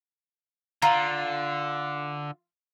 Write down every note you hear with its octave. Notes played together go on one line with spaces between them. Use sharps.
D3 F4 A#5